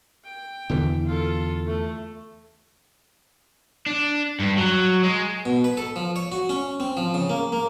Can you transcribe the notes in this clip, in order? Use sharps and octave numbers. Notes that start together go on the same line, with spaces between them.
G5
E2 D3 E3
F4 A4
A3
D4
G2
F#3
G#3
B2
B4
A4
F3
C#5
F#4
C#4
C4
F3
C#3
A#3
A#3